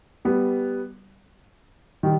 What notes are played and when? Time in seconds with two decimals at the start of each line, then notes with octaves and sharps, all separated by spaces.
0.25 G3 B3
2.03 D#3 G3